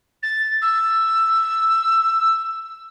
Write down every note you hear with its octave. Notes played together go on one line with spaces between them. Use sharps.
A6
E6